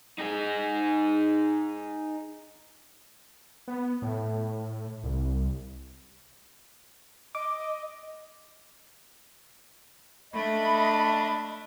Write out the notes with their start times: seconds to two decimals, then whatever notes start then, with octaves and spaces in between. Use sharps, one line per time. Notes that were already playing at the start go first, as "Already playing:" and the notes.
0.19 D#4 G#4
3.68 B3
4.02 A2
5.04 C2
7.35 D#5 D6
10.32 A3 D4 D#5 E5 B5